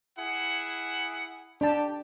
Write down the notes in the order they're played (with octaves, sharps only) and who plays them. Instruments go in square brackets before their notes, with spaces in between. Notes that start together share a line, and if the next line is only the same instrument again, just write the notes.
[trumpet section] E4 G#4 F#5
[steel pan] D4 A5 [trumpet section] G4